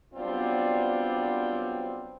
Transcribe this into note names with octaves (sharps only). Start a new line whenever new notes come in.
F#3 G3 B3 C4 D4 F4